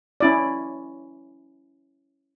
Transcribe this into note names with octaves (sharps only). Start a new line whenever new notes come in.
C#4 E4 D5